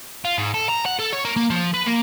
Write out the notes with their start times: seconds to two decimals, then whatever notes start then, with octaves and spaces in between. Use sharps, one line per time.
0.25 F4
0.38 G#2
0.54 A4
0.69 A#5
0.85 F#5
0.99 A4
1.13 C#5
1.25 A#3
1.36 A#3
1.50 F3
1.74 B4
1.86 A#3